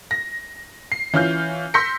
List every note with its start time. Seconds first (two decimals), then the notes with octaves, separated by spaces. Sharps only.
0.11 A#6
0.92 C7
1.13 E3 C#4 F4 F6 G6
1.74 C6 E6 G6 A#6 B6 C#7